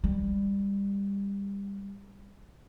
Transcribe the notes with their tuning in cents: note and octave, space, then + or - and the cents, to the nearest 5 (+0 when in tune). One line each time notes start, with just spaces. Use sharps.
G3 +20